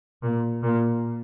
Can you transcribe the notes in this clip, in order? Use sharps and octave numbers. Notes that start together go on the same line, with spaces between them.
A#2
A#2